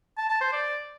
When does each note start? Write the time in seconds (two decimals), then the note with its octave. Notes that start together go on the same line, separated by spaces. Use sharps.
0.17 A5
0.29 A5
0.41 C5
0.53 D5